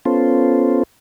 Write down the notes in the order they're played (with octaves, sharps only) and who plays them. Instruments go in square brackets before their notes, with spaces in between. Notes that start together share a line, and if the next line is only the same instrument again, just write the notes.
[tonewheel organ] B3 C#4 F4 A4 C5